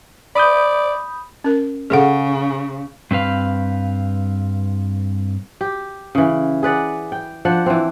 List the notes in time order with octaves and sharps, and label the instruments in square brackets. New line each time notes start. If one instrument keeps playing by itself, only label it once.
[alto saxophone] D5 [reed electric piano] B5 D#6 G6
[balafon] C#4 A#4
[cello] C#3 [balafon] G#4 A4 F#5
[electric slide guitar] G2 C4 B4 F5
[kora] G4
C#3 E3
G#4 B4 D5 F#5
G5
F3 D4 F#5
E3 C4